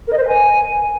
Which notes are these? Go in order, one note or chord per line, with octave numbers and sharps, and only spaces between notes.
A#4
D#5
C5
B4
G#5